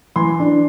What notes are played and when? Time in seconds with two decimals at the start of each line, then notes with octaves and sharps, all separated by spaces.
0.16 E3 C6
0.39 D4